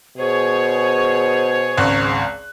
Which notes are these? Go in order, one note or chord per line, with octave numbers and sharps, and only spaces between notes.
B2 G#4 C5 C#5
G#1 C#2 F#6